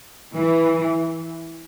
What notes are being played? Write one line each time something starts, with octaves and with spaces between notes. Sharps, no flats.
E3